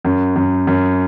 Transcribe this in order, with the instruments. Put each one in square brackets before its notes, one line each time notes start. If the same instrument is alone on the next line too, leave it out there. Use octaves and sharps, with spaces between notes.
[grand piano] F#2
F#2
F#2